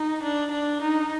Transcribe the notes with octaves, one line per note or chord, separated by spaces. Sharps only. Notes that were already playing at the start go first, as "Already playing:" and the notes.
Already playing: D#4
D4
D4
D#4